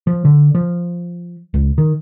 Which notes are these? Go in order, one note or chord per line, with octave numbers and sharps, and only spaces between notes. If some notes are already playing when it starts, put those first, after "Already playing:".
F3
D3
F3
C#2
D#3